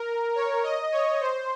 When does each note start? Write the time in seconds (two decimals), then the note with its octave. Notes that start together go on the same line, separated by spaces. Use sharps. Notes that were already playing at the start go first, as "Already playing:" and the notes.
Already playing: A#4
0.35 C#5
0.63 D#5
0.92 C#5
1.21 C5